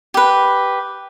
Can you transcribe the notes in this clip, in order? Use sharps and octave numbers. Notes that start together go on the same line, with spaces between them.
G4 B4